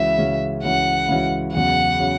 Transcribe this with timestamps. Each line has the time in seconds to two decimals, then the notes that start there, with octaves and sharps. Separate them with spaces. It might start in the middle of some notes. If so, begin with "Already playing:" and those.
Already playing: C#2 C#3 E3 C#4 F#4 E5
0.18 C#2 C#3 E3 C#4 F#4
0.63 C#2 C#3 E3 C#4 F#4 F#5
1.08 C#2 C#3 E3 C#4 F#4
1.53 E2 C#3 F#3 F#5
1.99 C#3 F#3